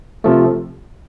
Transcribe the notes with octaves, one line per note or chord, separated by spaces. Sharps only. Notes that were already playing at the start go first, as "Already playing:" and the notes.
C3 F3 A3